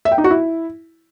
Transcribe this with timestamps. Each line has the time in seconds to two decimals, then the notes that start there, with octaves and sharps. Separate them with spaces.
0.05 E5
0.12 G5
0.18 D#4
0.24 F#4
0.31 E4